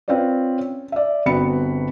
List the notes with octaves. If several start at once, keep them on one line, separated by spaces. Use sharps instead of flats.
C4 F4 B4 C#5 D5
C#4
D5 E5
G1 B3 C4 F#4 B5 C#7